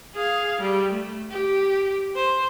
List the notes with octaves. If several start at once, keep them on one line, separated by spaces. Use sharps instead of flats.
G#4 F5
G3
A3
G4
C5